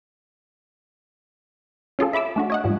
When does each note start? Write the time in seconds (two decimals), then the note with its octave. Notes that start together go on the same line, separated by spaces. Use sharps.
1.99 C#4 F4 G#4 A4
2.13 E5 B5 D6 E6
2.36 A3 D4 F#4
2.50 C#5 D#5 F#5
2.64 G#2 F3 G3